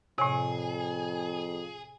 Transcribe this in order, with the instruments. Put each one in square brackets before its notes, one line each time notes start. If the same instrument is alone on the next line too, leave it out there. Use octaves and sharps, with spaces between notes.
[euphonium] F2 [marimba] A2 C3 [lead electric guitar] G#4 [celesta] C#5 G#5